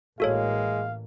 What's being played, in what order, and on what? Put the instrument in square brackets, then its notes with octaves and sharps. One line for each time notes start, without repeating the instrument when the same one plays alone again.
[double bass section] A1 E3 A#3 [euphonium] G#3 [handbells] F#4 A4 C#5 [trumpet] F5